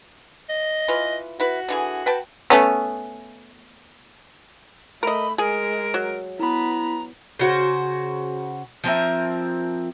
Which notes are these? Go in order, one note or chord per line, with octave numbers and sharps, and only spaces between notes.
D#5
E3 F4 B4
E4 F#4 B4
D3 E3 G#4
B4 G5 A5
A3 B3 C#4
A3 A#4 D#5 B5
G#3 G#4 A#4
F#3
B3 E4 A#5 B5
C#3 F#4 C5
F3 C4 A#4 E5